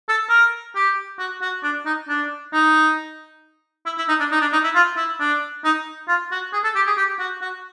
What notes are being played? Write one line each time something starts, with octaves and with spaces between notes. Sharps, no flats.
A4
A#4
G4
F#4
F#4
D4
D#4
D4
D#4
E4
E4
D#4
D4
D#4
D4
D#4
E4
F4
E4
D4
D#4
F4
F#4
G#4
A4
G4
G#4
G4
F#4
F#4